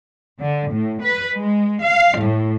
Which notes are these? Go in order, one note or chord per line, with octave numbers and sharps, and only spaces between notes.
D3
A2
B4
G#3
F5
A2